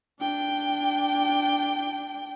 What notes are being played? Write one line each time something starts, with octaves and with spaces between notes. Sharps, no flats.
D4 G5